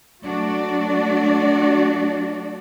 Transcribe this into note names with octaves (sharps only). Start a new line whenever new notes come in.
F#3 A3 D4 F#4 D5